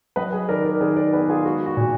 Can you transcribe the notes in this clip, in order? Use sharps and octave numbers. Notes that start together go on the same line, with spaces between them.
F#3 B4 D#5
G#4 B4
D#3 A#4 D5
A#4 D5
D#3 G#4 B4
A#4 D5
B3 G#4 B4
F4 G#4
G#3 F#4
F#4
A#2